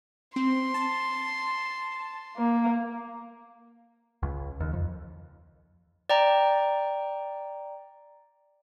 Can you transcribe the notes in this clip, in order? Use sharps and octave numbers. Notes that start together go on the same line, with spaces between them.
C4 C6
A5
A#3
C#2
D#2
F2
D5 G5 A#5